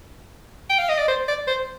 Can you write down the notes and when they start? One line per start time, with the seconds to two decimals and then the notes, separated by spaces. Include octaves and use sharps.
0.70 G5
0.79 F5
0.89 D#5
0.98 D5
1.08 C5
1.28 D5
1.47 C5